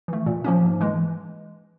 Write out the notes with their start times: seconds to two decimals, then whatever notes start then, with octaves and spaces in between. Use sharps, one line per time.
0.08 E3 A3
0.26 A#2
0.44 F3 A#3 C#4
0.63 G#2
0.81 E3 G#3